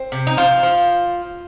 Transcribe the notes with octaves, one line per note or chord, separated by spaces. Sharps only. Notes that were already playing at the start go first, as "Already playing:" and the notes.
Already playing: C4
C3
D#4
F3 F4
F3